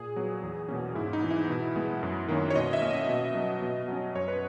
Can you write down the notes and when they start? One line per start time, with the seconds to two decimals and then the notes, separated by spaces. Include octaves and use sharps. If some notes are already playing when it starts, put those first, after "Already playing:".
Already playing: A#2 G#4
0.16 F#3 B3
0.43 E2
0.68 B2 A#3 C#4
0.95 G#2 E4
1.13 D#4
1.23 E3 B3
1.31 E4
1.49 B2
1.76 G#3 B3
2.03 F#2
2.28 D#3 A#3 C#4
2.50 C#5
2.55 B2 D#5
2.73 E5
2.82 A#3 C#4
2.91 D#5
3.09 B2
3.35 F#3 B3
3.62 B2
3.88 F#3 C#4
4.15 F#2 C#5
4.28 B4